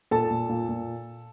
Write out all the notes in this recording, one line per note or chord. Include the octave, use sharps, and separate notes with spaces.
A#2 A4 A5
A#2
A#2
A#2